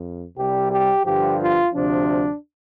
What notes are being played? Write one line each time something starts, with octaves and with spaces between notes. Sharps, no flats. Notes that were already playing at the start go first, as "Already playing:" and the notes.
Already playing: F2
C2 C3 G3 G4
G4
G2 D3 F3 G4
F4
D2 C3 F3 D4